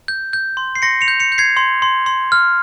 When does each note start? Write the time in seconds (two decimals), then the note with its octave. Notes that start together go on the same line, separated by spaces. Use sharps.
0.08 G6
0.33 G6
0.57 C6
0.75 C7
0.82 C6 A#6 C#7
1.01 C#7 F7
1.08 G6
1.20 C#7 F7
1.32 G6
1.38 G#6 C7
1.57 C6
1.82 C6
2.06 C6
2.32 F6